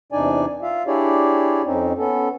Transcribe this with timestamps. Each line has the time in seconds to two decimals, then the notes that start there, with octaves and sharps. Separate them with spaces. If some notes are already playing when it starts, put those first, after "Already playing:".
0.12 E2 C3 D4 D#4 D5 G#5
0.62 F4 E5 F5
0.87 D4 E4 G4 G#4 C#5 D5
1.65 F2 C4 C#4 D#4
1.98 B3 C#4 A4